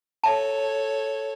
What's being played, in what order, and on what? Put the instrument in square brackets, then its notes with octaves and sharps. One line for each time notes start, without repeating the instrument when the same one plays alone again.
[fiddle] A4 C#5 [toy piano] E5 A5